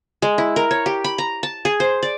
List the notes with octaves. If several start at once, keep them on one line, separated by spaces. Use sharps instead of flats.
G#3
E4
A#4
C#5
G4
B5
A#5
A5
G#4
C5
D5